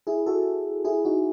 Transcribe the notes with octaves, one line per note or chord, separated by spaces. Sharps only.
E4 G#4
F#4 A4
E4 G#4
D#4 F#4